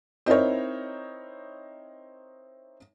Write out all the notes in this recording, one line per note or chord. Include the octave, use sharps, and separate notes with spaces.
C4 D#4 E4 A#4 C#5